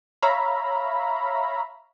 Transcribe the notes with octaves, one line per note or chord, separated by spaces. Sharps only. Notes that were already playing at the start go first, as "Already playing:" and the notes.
C#5 E5 F5 A#5 B5